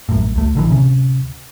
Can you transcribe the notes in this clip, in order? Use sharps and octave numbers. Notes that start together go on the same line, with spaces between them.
A#1 F#2 A2
C#2 A3
A#1 D3 E3
D1 C3 C#4